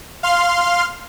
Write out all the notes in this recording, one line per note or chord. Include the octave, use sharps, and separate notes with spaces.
F5 C6 F6